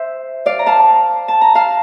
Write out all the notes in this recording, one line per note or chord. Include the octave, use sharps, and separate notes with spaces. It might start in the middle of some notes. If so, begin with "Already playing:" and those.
Already playing: C5 E5
D5 F5
A#5
F5 A5
A5
A#5
F5 A5